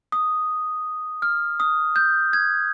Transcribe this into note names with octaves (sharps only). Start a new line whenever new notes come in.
D#6
F6
D#6
G6
G#6